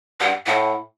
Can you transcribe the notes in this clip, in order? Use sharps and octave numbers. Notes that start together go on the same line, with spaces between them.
G2 F#5
A2 F#5